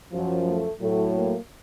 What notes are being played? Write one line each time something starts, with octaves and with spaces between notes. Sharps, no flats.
F#2 F3 F#3
A3
A2 F#3 A3
A#3